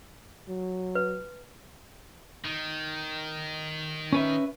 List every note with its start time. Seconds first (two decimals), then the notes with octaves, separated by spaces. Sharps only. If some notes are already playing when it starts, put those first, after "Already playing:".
0.48 F#3
0.95 B4
2.45 D#3
4.12 C#4 B4 E5